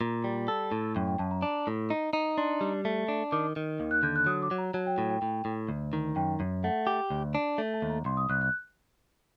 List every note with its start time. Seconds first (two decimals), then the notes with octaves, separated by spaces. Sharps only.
0.01 A#2 A#5
0.24 G3
0.48 A4
0.72 A2
0.95 F#2 G5
1.08 G5
1.19 F#2 A5
1.31 A#5
1.42 D4
1.67 A2
1.90 D#4
2.13 D#4
2.38 D4 C6
2.61 G3
2.85 A3
3.08 D4
3.32 D#3 D6
3.56 D#3
3.80 D#2
3.91 F#6
4.03 D3 G6
4.16 F#6
4.26 F#3 D#6
4.42 D6
4.51 F#3
4.58 A#5
4.74 F#3 A5
4.87 G5
4.98 A2 G5
5.10 G5
5.22 A2 G5
5.45 A2
5.69 D2
5.93 D#3
6.16 F#2 G5
6.40 F#2
6.64 A3 F#5
6.87 G4
7.10 D2
7.35 D4
7.58 A3 A5
7.74 A5
7.82 D#2
7.90 A#5
8.05 C2 C6
8.17 D#6
8.30 C2 F#6
8.41 F#6